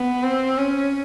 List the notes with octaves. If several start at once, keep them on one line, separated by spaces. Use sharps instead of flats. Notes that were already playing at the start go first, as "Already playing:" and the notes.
Already playing: B3
C4
C#4